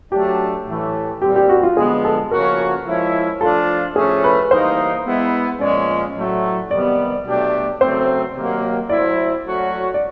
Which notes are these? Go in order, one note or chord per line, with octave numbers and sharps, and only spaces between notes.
F#3 A3 D4 G4
A2 E3 A3
A#2 G3 C4 G4
G4
F#4
F4
D3 F3 G#3 B3 G#4
A4
C#3 F3 A#3 C#4 F#4 A#4
F3 G#3 C#4 E4
F3 A3 D4 F4 A4
A2 F3 A3 C#4 G#4
B4
E3 G3 A#3 D#4 C5
G#3 B3 E4
A#2 F3 G#3 C#4 D5
A2 F#3 A3
C3 D#3 G3 B3 D5
B2 F#3 A3 D4 G4
C#3 F#3 A3 C4 C5
C3 D#3 F#3 A#3
F#3 A3 C4 E4 D5
F#3 A3 C#4 F#4
D5